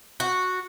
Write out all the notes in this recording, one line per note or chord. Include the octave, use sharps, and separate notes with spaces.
F#4